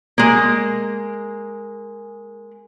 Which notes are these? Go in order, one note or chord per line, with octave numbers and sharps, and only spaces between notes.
G#3 A#3